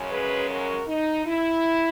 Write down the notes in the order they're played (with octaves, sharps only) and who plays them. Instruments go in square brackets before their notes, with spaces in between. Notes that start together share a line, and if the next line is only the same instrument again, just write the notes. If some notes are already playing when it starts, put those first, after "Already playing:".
Already playing: [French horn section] F#2 C#3 G#3
G#4 B4
F#4 A#4
D#4
E4